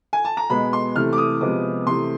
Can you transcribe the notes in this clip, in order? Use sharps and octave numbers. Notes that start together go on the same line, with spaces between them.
G#5
A5
A#5
B2 G#3 B3 B5
C6
C3 E3 A3 F6
D6
D#6
C3 F3 G#3 B3 D6
C3 E3 A3 C6